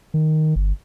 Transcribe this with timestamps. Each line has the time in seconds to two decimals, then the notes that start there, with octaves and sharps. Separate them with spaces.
0.14 D#3
0.56 G1